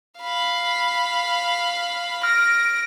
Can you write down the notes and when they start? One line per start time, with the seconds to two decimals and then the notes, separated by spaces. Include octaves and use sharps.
0.21 F5 B5
2.23 F6 A#6 D7